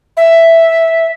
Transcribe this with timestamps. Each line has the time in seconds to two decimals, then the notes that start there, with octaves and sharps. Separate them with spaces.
0.17 E5